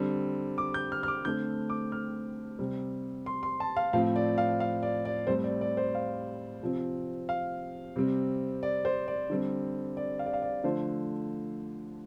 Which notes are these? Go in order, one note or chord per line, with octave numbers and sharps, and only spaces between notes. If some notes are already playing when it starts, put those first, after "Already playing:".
Already playing: D3 G3 C4
D6
G6
F6
F6
D6
D3 A3 C4 G6
D6
F6
C3 G3 C4
C6
C6
A5
F5
A2 F3 C4 F5
D5
F5
F5
D5
D5
A2 G3 C4 C5
D5
D5
C5
F5
C3 F3 C4
F5
C3 G3 C4
D5
C5
D5
D3 G3 C4
D5
F5
D5
F5
D5
D3 F3 A3 C5